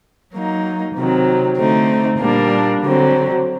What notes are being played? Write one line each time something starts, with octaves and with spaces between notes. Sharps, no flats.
F#3 A#3 D#4
C3 D#3 F#3 C4
D3 A3 C4 D#4
A#2 G3 A#3 D4
D3 F#3 C4